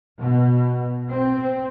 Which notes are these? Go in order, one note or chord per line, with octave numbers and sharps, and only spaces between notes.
B2
C4